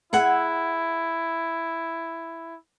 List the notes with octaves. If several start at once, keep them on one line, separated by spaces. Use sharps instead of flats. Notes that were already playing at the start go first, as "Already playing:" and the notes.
E4 G#4 E5 F#5